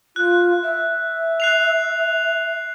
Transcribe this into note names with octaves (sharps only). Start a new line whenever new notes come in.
F4 F#6
E5
F#6 C7 F7